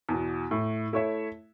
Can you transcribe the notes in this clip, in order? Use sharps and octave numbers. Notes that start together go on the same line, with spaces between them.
E2 B2
A2
A3 E4 C#5 E5